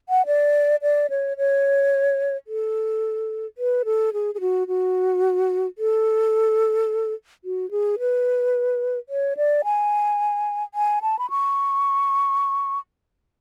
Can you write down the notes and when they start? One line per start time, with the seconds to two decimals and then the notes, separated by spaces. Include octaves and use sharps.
0.09 F#5
0.26 D5
0.82 D5
1.10 C#5
1.38 C#5
2.47 A4
3.58 B4
3.85 A4
4.13 G#4
4.35 G#4
4.41 F#4
4.68 F#4
5.78 A4
7.44 F#4
7.71 G#4
7.99 B4
9.09 C#5
9.37 D5
9.64 G#5
10.74 G#5
11.02 A5
11.19 B5
11.30 C#6